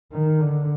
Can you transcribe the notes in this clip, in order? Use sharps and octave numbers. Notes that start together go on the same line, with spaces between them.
D#3
D3